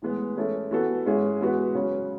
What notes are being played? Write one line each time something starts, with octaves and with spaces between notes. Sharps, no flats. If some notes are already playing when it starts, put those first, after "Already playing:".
A2 E3 G#3 B3
E3 G#3 C#4 E4 A4
E3 B3 F#4 A4
G#2 G#3 C#4 E4 G#4
E3 G#3 B3 F#4 B4
C#3 F#3 C#4